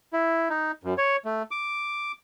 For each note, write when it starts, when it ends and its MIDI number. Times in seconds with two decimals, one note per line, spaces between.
0.13 0.48 64
0.50 0.72 63
0.84 0.94 42
0.98 1.16 73
1.25 1.42 57
1.51 2.12 86